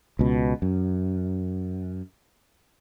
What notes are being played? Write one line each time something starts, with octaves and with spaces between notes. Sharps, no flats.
C#2 B2
F#2